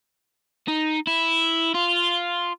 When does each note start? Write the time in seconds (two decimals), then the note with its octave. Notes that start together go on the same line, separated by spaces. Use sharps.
0.68 D#4
1.07 E4
1.74 F4